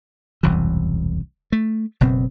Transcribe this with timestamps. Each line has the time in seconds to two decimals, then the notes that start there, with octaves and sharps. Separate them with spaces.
0.43 E1 C2 F#2 E3
1.52 A3
2.01 F#1 B2 B3 C4